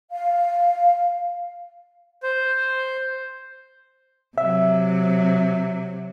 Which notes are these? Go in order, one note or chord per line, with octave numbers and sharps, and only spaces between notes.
F5
C5
C3 F#3 E5